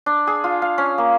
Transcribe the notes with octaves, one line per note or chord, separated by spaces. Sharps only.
D4
G#4
F4
F5
C#4
A#3